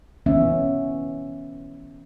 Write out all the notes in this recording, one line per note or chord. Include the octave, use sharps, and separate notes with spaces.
E3 B3 C#4 E5